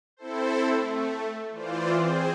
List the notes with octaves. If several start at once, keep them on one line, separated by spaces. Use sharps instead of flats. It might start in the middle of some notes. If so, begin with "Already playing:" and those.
C4 E4 A4 C5
A3
E3 F4 C5 D5
C4 G#4 C5